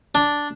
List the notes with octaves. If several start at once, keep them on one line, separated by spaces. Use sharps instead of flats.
D4